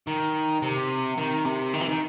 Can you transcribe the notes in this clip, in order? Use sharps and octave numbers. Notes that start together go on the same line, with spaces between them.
D#3
C3
D#3
C3
D#3
E3
D#3